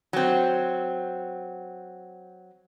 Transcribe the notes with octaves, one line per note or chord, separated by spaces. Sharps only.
F#3 C4